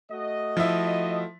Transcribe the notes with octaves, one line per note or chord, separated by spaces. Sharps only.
A3 F#4 D#5
F3 E4 E5